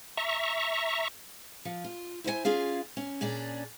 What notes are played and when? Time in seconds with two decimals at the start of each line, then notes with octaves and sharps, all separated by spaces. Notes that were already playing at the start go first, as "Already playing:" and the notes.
0.17 E5 A#5 C#6
1.65 F3
1.85 F4
2.24 E4 C5 C#5 G#5
2.45 C#4 F4 G#4 F5
2.97 C#4
3.21 A#2 C#4 D4 G#4 D5